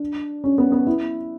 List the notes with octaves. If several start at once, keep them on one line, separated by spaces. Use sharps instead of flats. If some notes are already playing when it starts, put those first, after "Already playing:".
Already playing: D4
C#4
B3
B3
E4